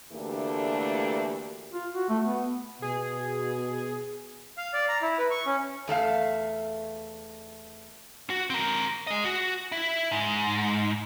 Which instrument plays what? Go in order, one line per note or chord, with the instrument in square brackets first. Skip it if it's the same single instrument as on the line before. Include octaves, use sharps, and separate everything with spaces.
[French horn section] D2 E3 A3 A#3 D4 G4
[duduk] F4
F#4
A3
B3
[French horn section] B2 [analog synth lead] G#4
[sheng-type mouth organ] F5
D5
A#5
E4
B4
C#6
C#4
[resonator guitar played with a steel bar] E2 A3 E5 F5
[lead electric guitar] F#4
C4 A#4
G#4 D#5
F#4
E4
G#2